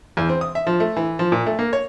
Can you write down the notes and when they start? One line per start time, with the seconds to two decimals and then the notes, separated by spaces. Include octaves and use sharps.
0.17 E2
0.29 C4
0.41 D#6
0.55 E5
0.67 F3
0.80 A3
0.97 E3
1.19 F3
1.32 A#2
1.46 A3
1.59 A#3
1.73 C#5